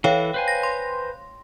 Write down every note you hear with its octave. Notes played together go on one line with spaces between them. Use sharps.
E3 A4 C#5 F5 G5
B4 C5 G#5
A#6
C6